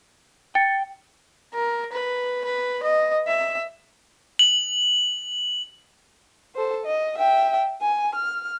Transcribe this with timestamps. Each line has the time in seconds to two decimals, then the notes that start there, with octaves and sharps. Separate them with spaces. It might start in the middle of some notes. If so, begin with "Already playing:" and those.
0.55 G5 A6 C#7
1.54 A#4
1.92 B4
2.44 B4
2.83 D#5
3.27 E5
4.39 F#7
6.56 A4 C5
6.86 D#5
7.18 E5 G5
7.81 G#5
8.15 F6